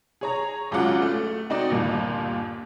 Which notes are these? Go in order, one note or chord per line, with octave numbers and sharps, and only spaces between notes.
G#4 C#5 A#5
G#1 C#2 F#3 F4 F#5 D6
A3
C4 D#4 F#4 D5
G1 D#2 A#2